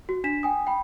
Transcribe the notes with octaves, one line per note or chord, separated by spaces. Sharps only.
F#4
D4 B6 E7
G5 G#5 D#6
G5 B5